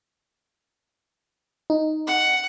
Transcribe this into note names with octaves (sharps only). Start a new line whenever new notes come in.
D#4
F#5